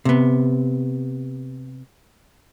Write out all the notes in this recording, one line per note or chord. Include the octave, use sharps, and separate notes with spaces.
C3 B3